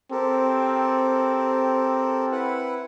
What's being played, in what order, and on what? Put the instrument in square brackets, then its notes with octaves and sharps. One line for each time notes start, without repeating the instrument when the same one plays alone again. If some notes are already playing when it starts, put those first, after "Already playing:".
[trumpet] C4 [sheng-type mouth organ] G4 A4 A#4
[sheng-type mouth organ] E4 B4 F#5